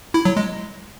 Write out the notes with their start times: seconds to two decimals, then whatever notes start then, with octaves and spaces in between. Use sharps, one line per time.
0.14 E4
0.25 F#3
0.37 G#3